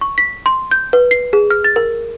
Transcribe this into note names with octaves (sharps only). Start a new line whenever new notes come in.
C#6
B6
C6
G6
B4
C7
G#4
F6
A6
A#4